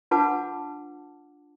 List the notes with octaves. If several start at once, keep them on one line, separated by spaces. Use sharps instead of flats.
D4 F4 B4 F#5 A5 D6